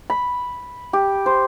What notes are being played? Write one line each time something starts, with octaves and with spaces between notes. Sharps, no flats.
B5
G4
C5